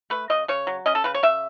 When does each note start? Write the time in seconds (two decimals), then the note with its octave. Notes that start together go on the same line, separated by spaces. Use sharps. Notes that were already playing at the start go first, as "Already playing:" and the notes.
0.10 A3 B4
0.30 C#3 D#5
0.48 C#3 C#5
0.67 F#3
0.86 C#4 D#5
0.95 A4
1.04 C#3 B4
1.14 C#5
1.23 C#3 E5